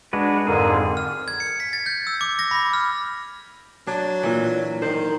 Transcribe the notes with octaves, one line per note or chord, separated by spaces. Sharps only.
G#3 D4 F#4 B4
F2 G#2 D3 G#4 A#4
F6
G#6
C#7
B6
A6
G6
E6
D6
A#6
B5
F6
F#3 D4
A#2 E3
D#3 C5